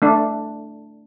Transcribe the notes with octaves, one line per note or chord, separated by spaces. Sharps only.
A3 D4